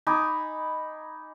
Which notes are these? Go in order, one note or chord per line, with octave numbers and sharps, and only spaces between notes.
D#4 G#5 B5 D6